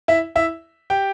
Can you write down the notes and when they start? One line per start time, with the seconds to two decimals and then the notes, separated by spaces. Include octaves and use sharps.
0.08 E4 E5
0.36 E4 E5
0.90 G4 G5